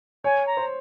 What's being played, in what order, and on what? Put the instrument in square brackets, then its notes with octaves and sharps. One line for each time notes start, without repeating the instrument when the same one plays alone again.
[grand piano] C#5 [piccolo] G#5
[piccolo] A#5
[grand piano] C5